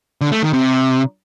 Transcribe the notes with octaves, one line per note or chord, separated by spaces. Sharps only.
D3
A3
D#3
C3